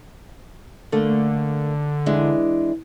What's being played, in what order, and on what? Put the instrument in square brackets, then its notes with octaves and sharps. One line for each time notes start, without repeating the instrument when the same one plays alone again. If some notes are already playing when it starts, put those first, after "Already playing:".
[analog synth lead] D3 [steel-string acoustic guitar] A3 A#3
[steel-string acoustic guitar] E3 G#3 D4